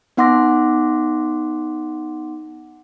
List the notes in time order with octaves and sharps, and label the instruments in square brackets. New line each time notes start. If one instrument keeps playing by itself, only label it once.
[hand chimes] B3 D#4 F#5 C6 D6 A#6